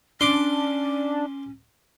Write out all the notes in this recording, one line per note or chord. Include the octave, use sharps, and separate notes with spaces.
C#4 D4 C6 D6